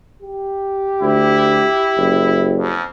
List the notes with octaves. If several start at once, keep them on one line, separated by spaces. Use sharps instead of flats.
G4
D2 E4
F#1
F2